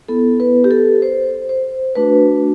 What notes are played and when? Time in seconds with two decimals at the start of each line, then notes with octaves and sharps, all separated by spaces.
0.09 B3 E4 A4
0.40 B4
0.64 G4
0.71 A4
1.02 C5
1.49 C5
1.96 A3 D4 F#4 B4